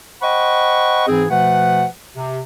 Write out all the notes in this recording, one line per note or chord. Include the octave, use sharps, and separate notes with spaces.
C5 D#5 F#5 G5 B5 C#6
G#2 E3 C4 G#4
B2 F3 A3 B4 F#5
C3